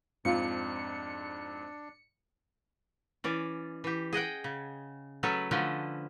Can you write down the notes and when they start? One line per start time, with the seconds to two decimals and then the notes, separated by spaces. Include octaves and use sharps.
0.25 F2 G#2 C4 D4 F4 C#7
3.24 E3 C#4 D5
3.84 E3 G4
4.13 G#4 D#5 F#5 G5
4.44 C#3
5.23 F#3 A3 C#4 A4 B4
5.51 D3 F3 A3 C#4 B4